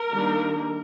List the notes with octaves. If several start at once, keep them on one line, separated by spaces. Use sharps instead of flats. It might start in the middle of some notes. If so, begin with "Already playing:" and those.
Already playing: A#4
D#3 G3 A#3 D4